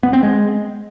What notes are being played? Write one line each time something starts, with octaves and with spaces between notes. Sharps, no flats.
B3
C4
G#3